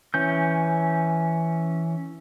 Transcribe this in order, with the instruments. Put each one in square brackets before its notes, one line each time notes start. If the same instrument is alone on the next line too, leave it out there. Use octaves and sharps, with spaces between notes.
[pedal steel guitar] E3 C#4 G6